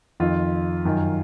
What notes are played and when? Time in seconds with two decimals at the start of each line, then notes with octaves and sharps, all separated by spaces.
0.20 F2 D#3 F4
0.85 F#2 D#3